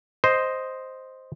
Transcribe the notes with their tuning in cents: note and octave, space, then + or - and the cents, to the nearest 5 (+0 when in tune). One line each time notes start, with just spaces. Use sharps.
C5 +0 D#5 +0